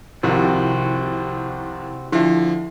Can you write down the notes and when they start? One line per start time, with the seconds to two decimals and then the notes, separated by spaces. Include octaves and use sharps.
0.23 C2 C3 D#3 F3 C4 F#4
2.12 D3 F3 E4 E5